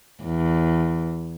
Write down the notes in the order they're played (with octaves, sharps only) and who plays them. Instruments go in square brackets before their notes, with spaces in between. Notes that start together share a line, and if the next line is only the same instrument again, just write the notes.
[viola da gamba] E2